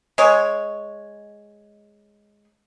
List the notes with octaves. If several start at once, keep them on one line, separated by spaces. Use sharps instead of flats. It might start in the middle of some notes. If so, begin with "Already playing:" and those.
G#3 C#5